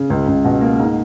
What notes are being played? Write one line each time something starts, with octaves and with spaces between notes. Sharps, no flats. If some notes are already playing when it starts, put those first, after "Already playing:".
Already playing: C#3
C#2
C#2
B2
A#3
G#2